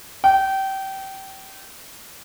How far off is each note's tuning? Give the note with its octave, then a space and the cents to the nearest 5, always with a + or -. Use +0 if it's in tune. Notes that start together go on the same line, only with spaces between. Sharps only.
G5 -25